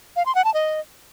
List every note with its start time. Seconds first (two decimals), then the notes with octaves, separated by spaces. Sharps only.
0.16 F5
0.26 C6
0.35 F#5
0.45 A5
0.54 D#5